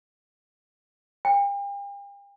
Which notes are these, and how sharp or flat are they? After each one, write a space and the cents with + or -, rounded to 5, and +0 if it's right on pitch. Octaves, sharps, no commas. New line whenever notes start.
G5 +40